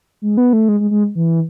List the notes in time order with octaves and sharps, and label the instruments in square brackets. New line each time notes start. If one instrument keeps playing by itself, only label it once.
[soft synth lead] G#3
B3
A3
G#3
G#3
G#3
E3